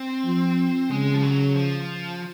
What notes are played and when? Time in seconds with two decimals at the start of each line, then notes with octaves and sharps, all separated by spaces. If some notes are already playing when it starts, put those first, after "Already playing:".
Already playing: C4
0.25 F3
0.90 C#3 G#3
1.14 F3
1.22 F#3
1.55 F3